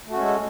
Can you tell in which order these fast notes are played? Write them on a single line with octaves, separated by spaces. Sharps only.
A3 F#4 C#4 G#3 A4